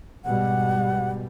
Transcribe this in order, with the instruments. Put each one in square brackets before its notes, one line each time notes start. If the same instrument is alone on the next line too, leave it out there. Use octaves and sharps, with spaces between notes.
[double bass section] G#2 B2 G3 [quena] F#5